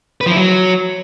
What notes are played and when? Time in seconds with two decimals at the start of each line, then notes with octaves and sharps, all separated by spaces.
0.21 B4
0.26 F3
0.31 E4
0.37 F#3